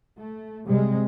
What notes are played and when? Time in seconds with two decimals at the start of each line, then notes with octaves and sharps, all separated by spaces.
0.17 A3
0.66 C3 G3 G#3